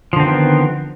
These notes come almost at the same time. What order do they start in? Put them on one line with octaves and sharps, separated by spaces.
F3 D3 C4 D#3 B3